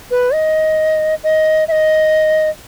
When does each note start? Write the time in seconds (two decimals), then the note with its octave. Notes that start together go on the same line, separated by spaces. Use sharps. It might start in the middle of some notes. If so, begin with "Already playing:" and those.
0.11 B4
0.33 D#5
1.24 D#5
1.68 E5
1.72 D#5